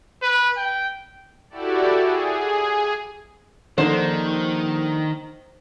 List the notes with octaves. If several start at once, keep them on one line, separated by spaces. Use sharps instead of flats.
B4
G5
E4 F#4 G4 A4 D5
G#4
A#1 D3 D#3 D#4 C5